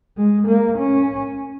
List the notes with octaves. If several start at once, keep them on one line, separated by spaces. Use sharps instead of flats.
G#3
A#3
C#4